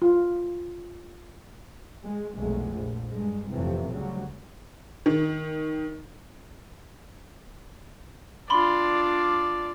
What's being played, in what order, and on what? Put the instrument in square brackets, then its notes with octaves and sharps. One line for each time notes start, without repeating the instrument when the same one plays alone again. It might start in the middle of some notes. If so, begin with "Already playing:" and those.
[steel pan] F4
[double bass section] G#3
F1 B1 G#3 A3
A#1
G2 G#3
F2 A2 C3 E3
D2 C#3 F#3 G3
[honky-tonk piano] D#3
[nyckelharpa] D4 F4 [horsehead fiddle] D5 [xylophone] B5 C6